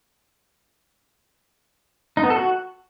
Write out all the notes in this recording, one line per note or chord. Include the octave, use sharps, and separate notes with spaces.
D#4
B3
A4
F#4